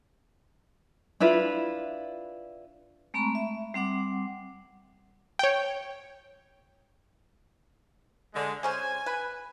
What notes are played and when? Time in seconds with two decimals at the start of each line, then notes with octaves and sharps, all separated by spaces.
1.20 D4 E4 F4 B4
3.14 G#3 A3 C4 A#5 B5 C#6
3.35 E5
3.74 G3 C4 F#5 D6
5.39 C#5 G5
8.33 D3 G#3
8.63 G#3 C#4 C5 G#5
9.06 B4